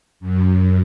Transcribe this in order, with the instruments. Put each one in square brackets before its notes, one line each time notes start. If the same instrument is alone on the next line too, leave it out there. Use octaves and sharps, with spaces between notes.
[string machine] F#2